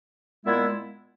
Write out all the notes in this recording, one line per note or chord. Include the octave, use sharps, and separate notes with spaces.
A#2 G#3 B3 E4